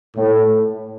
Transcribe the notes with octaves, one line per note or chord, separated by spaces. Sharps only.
A2